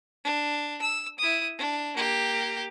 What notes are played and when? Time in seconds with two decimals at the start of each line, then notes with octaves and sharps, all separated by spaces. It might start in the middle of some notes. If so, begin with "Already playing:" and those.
0.24 D4
0.82 E6
1.18 E4 D#6
1.58 D4
1.96 A#3 G4